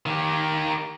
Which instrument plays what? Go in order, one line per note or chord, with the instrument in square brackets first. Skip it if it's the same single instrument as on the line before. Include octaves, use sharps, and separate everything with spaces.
[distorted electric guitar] D#3 G4